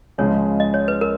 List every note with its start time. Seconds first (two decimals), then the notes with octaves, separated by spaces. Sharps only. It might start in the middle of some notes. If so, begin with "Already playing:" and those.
0.18 C#2 C#3 F3 G#3 C#5
0.60 D#5
0.74 C#5
0.88 B4
1.01 A#4